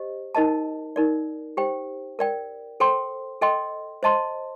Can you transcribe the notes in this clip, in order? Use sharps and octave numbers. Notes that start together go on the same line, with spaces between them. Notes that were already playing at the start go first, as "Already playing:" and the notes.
Already playing: G4 C5 D#5
D#4 A#4 D#5 A5
D#4 A#4 D5
G4 C5 G5
A#4 D5 G5
A4 C5 G5 C6
A4 D#5 G5 C6
C5 D#5 A5 C6